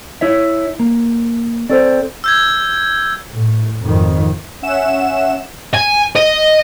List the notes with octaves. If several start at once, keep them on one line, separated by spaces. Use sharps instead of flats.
E4 C#5 E5
A#3
C4 A4 C5 D5
E6 G6 G#6
A2
G#1 F2 D#3
C#4 E5 F#5 E7
G#5
D#5